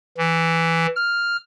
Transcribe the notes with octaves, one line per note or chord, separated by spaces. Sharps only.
E3
F6